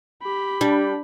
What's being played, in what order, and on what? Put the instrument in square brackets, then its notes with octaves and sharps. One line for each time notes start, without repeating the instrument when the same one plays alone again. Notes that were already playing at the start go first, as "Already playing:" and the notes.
[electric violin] G4 B5
[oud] G3 [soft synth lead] D4